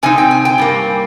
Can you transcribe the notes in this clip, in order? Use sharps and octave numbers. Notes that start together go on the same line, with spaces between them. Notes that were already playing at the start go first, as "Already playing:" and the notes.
C3 F3 C4 D#4 G#5
G5
G#5
G5
G2 G3 A#3